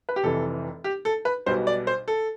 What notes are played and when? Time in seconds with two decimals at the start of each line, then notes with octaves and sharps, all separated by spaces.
0.09 B4
0.16 G4
0.23 F1 F2 C3 E3 A4
0.84 G4
1.05 A4
1.25 B4
1.46 B1 B2 G3 B3 C5
1.67 D5
1.87 C5
2.08 A4